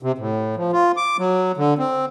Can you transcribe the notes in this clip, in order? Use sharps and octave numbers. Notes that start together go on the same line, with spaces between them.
C3
A2
F3
F4
D6
F#3
D3
C4